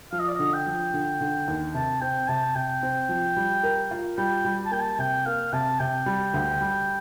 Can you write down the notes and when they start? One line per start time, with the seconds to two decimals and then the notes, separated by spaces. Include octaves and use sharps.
0.12 F3 F5
0.19 D#5
0.28 D5
0.35 D3 D#5
0.53 G5
0.66 F3
0.94 D3
1.21 D3
1.48 D#2
1.74 C3 A5
2.01 C4 G5
2.28 C3 A5
2.55 C3 G5
2.83 C4
3.09 F3
3.37 G3
3.63 A#4
3.91 F4
4.17 G3 G5
4.45 G3
4.66 A5
4.71 A#3 G5
4.80 A5
4.99 C3 G5
5.26 A#3 F5
5.53 C3 A5
5.79 C3 G5
6.06 G3
6.34 D2
6.61 G3